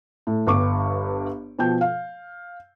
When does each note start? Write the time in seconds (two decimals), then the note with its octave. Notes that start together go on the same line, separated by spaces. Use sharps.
0.27 A2
0.47 G1 G2 G4 C#6 D6
1.59 B2 F3 G5 G6
1.81 F5